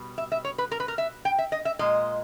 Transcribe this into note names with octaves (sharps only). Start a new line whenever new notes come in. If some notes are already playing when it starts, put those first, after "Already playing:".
Already playing: B2 G3
E5
E5
C#5
B4
A#4
B4
A#4
E5
G5
E5
D#5
E5
A#2 G#3 D#5